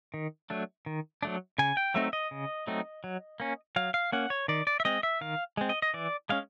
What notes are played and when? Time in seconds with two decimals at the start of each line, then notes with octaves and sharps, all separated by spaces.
0.14 D#3
0.50 F#3 A3 D4
0.86 D#3
1.23 F#3 A3 D4
1.58 C#3 G#5
1.77 G5
1.94 F#3 A3 C4 D#4 E5
2.13 D#5
2.31 C#3
2.67 F#3 A3 C4 D#4
3.04 F#3
3.40 A#3 C#4
3.76 F#3 F5
3.94 F5
4.12 A#3 C#4 F#5
4.30 C#5
4.48 D#3 D5
4.67 D5
4.80 E5
4.85 G#3 C4 D#5
5.03 E5
5.21 D#3 F5
5.57 G#3 C4
5.69 D#5
5.82 D#5
5.94 E3 D5
6.29 G#3 C#4 F5